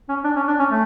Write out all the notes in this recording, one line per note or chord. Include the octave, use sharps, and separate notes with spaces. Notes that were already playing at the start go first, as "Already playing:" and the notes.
C#4
D4
C#4
D4
C#4
A3